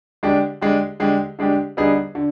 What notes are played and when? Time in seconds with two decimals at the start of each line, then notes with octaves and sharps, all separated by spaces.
0.23 D3 G#3 D4 G4
0.61 D3 G#3 D4 G4
1.00 D3 G#3 D4 G4
1.39 D3 G#3 D4 G4
1.77 D3 G3 B3 D#4 G#4
2.15 D3